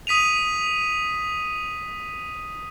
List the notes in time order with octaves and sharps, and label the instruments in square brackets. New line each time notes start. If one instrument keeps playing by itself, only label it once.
[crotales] D#6 B6 D#7 F7